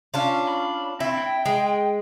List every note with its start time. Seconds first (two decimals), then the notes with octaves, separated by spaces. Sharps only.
0.14 C#4 D4 F4
0.49 B5
1.00 C4 E4
1.17 G5
1.46 G#3